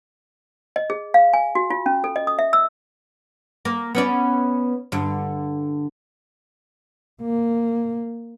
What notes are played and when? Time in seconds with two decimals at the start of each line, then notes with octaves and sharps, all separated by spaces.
0.76 D#5
0.90 G#4
1.14 F5
1.33 G#5
1.55 F#4
1.70 F4
1.86 C#4
2.04 A4
2.16 D#5
2.27 D#6
2.39 E5
2.53 E6
3.65 A#3
3.95 B3 C#4 D5
4.92 G2 D3
7.21 A#3